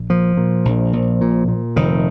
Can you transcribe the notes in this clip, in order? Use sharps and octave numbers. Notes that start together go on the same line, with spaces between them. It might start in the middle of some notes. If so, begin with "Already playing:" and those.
Already playing: A#1
A#2 F3
A#2
A#1
A#1
A#2
A#2
F1 D#3